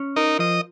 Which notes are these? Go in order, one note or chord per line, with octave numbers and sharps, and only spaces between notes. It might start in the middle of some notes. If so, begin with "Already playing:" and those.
Already playing: C#4
D#4 A#4
F3 D#5